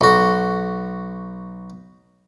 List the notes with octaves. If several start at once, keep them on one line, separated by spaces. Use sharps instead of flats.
B1 F#4